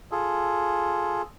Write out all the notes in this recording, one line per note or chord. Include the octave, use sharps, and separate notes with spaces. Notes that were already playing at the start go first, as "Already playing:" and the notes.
F4 G#4 A4